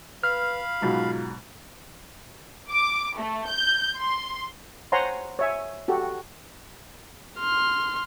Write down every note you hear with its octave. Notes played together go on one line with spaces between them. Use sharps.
B4 F5 B5 F6
G#2 B2 F#3 F4
D6
A3
G6
C6
C5 C#5 F#5 G#5 A#5 C6
C#5 E5 G#5
F#4 G4 A4
C6 F6